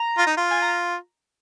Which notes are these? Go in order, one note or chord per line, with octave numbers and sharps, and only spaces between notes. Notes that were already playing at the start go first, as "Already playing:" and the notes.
Already playing: A#5
F4
D#4
F4
G#5
A#5